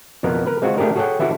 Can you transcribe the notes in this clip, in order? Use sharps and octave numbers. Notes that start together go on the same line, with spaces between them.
F2 B2 B3 A#4
A#4 B4
G#3 C4 F4 F#4
A3 D4 G4 G#4 A#4
F#4 G#4 A4 C#5 F#5 G5
E4 F#4 G4 A4 B4 E5